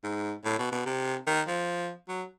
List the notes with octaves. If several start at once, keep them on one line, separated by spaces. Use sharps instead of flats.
G#2
A2
B2
B2
C3
D#3
F3
F#3